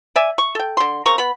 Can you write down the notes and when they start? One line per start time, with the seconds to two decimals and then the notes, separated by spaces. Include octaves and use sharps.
0.16 D5 E5 G#5
0.38 C#6
0.55 A4 G5
0.77 D3 C6
1.06 C#3 C4 A#4 C#6
1.18 B3 B5